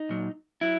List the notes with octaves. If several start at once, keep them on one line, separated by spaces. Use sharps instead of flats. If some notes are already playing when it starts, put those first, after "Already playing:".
Already playing: D#4
A#2 F#3
F#3 E4